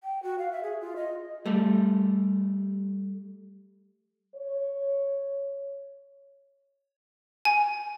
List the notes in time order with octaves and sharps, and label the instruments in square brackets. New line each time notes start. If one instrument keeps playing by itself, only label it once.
[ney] G5
F#4
F5
E5
G#4
F4
D#5
[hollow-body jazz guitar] G3 A3
[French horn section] C#5
[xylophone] G#5